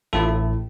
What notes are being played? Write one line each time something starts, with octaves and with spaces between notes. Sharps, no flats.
A1 A2 A3 F4 A4